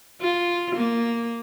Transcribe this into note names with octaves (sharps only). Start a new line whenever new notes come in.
F4
A#3